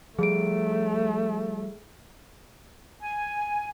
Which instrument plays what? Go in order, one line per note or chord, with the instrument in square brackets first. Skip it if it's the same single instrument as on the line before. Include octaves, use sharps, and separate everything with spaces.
[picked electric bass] F3 G3 [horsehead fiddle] A3 [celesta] G#4 D7
[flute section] G#5